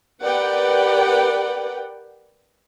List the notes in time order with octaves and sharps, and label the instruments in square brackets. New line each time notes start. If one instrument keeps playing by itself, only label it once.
[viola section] G4 A#4 B4 D5 F#5 G5